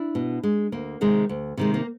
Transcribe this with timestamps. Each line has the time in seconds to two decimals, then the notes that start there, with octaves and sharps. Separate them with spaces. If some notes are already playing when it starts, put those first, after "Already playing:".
Already playing: D4 E4
0.15 B2
0.43 G#3
0.72 D2 A#3
1.01 C3 D#3 G#3
1.29 D2
1.57 C3 D#3 G#3
1.74 A#3